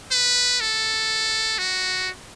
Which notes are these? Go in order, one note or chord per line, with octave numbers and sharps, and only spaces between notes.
B4
A4
F#4